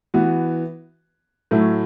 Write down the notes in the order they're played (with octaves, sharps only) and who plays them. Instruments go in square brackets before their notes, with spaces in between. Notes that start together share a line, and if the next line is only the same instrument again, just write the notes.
[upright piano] E3 B3 F#4
A2 F#3 A3 E4